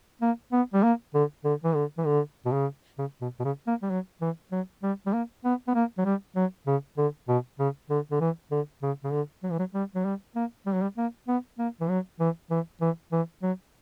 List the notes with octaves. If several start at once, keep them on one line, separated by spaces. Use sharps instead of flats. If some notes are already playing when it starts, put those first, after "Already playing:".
A#3
B3
G3
A#3
D3
D3
E3
D3
E3
D3
B2
C#3
C#3
B2
B2
C#3
A#3
G3
F#3
E3
F#3
G3
G3
A#3
B3
B3
A#3
F#3
G3
F#3
C#3
D3
B2
C#3
D3
D3
E3
D3
C#3
C#3
D3
F#3
E3
F#3
G3
F#3
G3
A#3
G3
F#3
G3
A#3
B3
A#3
E3
F#3
E3
E3
E3
E3
F#3